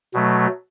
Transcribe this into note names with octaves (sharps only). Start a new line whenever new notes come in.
B2 F#3 A3